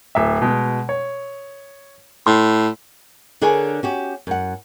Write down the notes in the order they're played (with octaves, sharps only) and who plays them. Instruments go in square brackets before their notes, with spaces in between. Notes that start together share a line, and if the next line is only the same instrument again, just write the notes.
[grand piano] D1 E5
B2 G#3
C#5
[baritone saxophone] A2 [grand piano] C6
[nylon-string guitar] D3 D4 G#4 A#4 C#5 G#5
C#4 F#4 G4
F#2 F#5